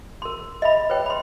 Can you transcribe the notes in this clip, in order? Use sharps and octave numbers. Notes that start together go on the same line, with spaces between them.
A#4 C6
D#5 E5 B5
B4 C#5 G5
B5 C6